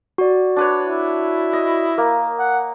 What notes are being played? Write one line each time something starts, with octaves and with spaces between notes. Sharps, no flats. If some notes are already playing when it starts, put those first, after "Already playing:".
F#4 D5
D4 B4 C#5
E4
D#5
A#3 A#4
F#5